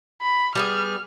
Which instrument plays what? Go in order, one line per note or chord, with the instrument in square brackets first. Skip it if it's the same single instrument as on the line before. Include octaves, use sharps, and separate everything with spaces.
[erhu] B5
[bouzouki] G3 B3 G#4 [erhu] F6